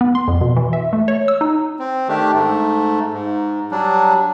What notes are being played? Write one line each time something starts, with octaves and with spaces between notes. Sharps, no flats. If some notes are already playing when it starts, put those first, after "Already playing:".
B3
C6
F2
B2
E3
E5
A3
C#5
E6
D#4
C4
D#3 A3 D4 G4
G#2 A3
G#2
F#3 G3 D4